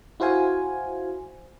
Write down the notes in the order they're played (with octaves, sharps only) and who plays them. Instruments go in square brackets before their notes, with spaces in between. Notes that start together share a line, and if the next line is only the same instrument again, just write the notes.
[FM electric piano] E4 F#4 C5 F5 G#5